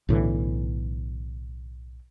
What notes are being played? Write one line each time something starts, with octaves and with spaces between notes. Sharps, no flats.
B1 A2 D3 E3